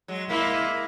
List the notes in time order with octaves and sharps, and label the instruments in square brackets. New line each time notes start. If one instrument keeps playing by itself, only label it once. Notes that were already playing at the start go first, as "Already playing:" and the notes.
[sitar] F#3 G#3
[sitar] G#3 A#3 [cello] E4